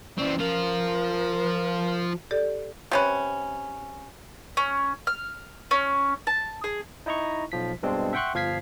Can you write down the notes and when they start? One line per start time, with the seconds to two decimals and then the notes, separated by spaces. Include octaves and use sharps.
0.18 E3 C4 C#4 D5
0.39 F3 F4 A#4
2.31 G4 A4 D5
2.91 C3 C#4 B4
4.57 C#4
5.07 F6
5.71 C#4
6.27 A5
6.64 G#4
7.06 D#4 E4 D#5 A#5 C#6
7.52 B1 F3 B6
7.83 G2 B2 G#3 C4 D4
8.13 E5 F#5 G5 C6 C#6 F#6
8.34 G1 F3 F5 G#6 B6 C7